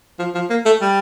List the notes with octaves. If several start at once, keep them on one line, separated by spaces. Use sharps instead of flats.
F3
F3
A#3
A3
G3